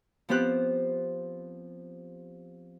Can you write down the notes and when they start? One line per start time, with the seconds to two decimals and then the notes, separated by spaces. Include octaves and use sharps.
0.29 F3 B3 C4 G4 F#6